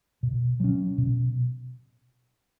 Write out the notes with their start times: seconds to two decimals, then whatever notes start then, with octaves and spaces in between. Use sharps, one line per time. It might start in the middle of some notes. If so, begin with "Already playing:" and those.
0.23 B2
0.60 F#3 C#4
0.98 B2